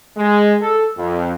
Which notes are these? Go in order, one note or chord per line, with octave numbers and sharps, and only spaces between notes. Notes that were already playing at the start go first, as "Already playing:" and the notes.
G#3
A4
F2